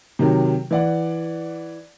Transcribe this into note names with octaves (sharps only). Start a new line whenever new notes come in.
C3 D#3 F#3
E3 D5 F#5